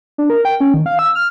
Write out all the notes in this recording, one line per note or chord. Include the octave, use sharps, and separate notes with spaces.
D4
A#4
G5
C#4
D#3
F5
E6
F6